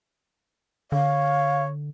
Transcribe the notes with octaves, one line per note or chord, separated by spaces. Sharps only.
D3 C#5 F5